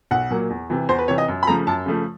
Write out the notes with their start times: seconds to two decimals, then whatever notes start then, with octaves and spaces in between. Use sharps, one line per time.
0.11 B1 F#5
0.30 A#2 F#3 A#3
0.50 E2
0.70 C3 E3
0.89 E2 C5
0.99 B4
1.08 C3 E3 C#5
1.18 D#5
1.28 F#2
1.43 B5
1.47 C#3 F3 A3 A#5
1.67 F#2 A5
1.86 C#3 F3 A3